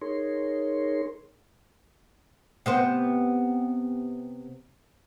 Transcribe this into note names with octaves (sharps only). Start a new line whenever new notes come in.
D#4 G#4 A#4 C#5 C6
C3 B3 C5